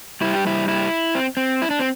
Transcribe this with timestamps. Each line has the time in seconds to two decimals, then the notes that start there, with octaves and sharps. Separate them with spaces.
0.21 G2 G3 E4
0.34 G4
0.47 E4
0.68 E4
1.15 C4
1.37 C4
1.62 E4
1.70 D4
1.79 C4